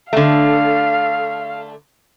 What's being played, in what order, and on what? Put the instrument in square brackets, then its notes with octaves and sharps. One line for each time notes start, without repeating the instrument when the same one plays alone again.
[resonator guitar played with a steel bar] D3 A3 [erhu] F5